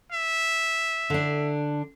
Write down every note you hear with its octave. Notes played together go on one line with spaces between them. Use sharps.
E5
D3 D4